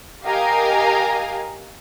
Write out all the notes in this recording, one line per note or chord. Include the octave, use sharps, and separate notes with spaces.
G4 A#4 D#5 F5 G#5 A#5